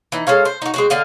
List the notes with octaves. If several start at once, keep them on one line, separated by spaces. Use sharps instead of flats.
E3 D#4
G#3 A4 C#5 F5
C5
D#4 F#4
G#3 C4 F#4
D3 D#5 F5